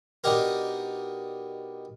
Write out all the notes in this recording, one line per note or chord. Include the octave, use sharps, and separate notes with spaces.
B2 D4 D#4 G4 A#4